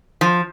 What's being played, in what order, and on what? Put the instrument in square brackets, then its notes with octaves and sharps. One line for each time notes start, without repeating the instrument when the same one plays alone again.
[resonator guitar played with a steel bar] F3